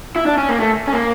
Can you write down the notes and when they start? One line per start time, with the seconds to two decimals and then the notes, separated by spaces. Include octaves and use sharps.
0.16 E4
0.26 D4
0.38 C#4
0.49 A#3
0.60 A3
0.87 C#4
0.93 A#3